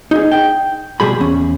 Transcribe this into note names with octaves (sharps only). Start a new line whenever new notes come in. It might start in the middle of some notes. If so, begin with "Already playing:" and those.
D#4 G#4
G5
B2 G3 G#4 B5
E2 C#4